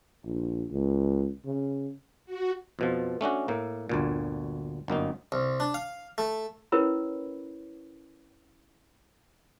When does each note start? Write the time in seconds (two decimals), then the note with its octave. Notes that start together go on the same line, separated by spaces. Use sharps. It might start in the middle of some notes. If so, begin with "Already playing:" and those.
0.25 A#1
0.71 C#2
1.45 C#3
2.26 F#4
2.79 F2 B2 F3
3.21 A3 C#4 D4 F#4
3.48 A2 A#3
3.89 G1 D2 A#2
4.88 G1 F#2 A#3 D#4
5.32 C2
5.60 D4
5.74 F5
6.18 A3
6.72 C#4 E4 A#4 B4 C#5 B5